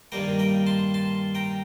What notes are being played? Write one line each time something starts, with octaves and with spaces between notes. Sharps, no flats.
G2 D#3 G3 A#3 G5 A#5
G5 A#5
A5 C6
A5 C6
G5 A#5